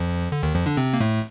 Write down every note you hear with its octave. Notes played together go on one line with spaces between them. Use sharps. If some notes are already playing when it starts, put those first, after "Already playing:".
Already playing: F2 F3
D3
D#2 D#3
F2 F3
D3 D4
C3 C4
A#3
A2 A3